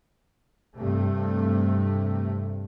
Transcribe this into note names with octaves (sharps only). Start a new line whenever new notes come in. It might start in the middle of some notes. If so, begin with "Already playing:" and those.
G2 C3 A3